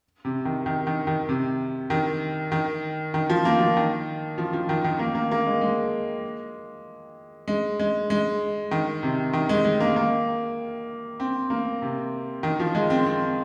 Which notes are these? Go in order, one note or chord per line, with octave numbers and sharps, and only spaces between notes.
C3
D#3
D#3
D#3
D#3
C3
D#3
D#3
D#3
F3
A#3
F3
D#3
F3
F3
D#3
D#3
A#3
A#3
A#3
G#3
G#3
G#3
G#3
G#3
D#3
C3
D#3
G#3
G#3
A#3
A#3
C4
A#3
C3
D#3
F3
G#3
C4
C4